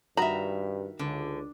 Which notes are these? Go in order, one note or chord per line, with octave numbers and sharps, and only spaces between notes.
G2 D#3 F#4 E5 A#5 B5
C#2 D3